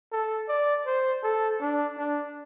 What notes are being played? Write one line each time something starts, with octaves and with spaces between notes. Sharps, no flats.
A4
D5
C5
A4
D4
D4